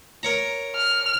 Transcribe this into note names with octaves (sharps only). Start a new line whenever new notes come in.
A#4 C#5 A#5
F6